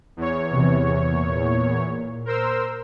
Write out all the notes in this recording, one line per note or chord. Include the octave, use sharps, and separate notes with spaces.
E2 C#5
C3 E3
A#2
A#4 C5 E6